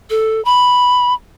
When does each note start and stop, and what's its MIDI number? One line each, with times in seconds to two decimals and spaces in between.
0.10 0.43 69
0.45 1.13 83